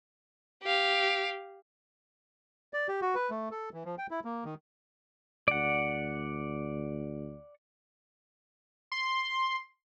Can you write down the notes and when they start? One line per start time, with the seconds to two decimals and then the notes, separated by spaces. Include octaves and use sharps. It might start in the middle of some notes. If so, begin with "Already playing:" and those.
0.63 G4 F5
2.73 D5
2.88 G4
3.02 F#4
3.15 B4
3.30 A3
3.51 A4
3.73 E3
3.85 F3
3.98 G5
4.11 E4
4.25 A#3
4.45 D#3
5.48 D2 D5 F#5
8.92 C6